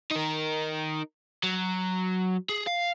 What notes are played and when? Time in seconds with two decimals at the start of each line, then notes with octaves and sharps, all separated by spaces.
0.11 D#4 A#4
1.43 F#3
2.49 G#4
2.67 F5